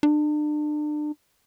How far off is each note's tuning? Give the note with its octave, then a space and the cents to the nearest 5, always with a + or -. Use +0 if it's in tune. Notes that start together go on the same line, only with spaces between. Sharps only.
D4 +35